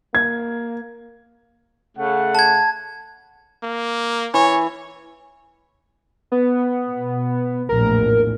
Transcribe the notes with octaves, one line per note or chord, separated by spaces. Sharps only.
A#3 G#6
C#3 A3 F#5
A5 G#6
A#3
E3 C#5
B3
B2
A#1 E2 A2 A#4